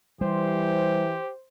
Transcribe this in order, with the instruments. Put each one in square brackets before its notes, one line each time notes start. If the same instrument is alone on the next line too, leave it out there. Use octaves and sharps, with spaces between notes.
[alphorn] E3 [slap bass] G3 [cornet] G4 [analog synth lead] C5